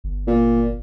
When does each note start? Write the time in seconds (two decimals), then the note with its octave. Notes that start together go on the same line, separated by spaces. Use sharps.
0.04 G1
0.28 A#2